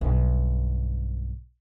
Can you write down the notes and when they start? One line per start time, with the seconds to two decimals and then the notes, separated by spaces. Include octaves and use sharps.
0.01 B1 G2